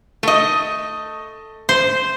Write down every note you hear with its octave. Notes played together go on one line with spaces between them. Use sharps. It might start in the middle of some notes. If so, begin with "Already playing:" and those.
A3 D#5
C5